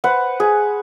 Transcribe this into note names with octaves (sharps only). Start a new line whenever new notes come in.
B4 C5 F#5
G#4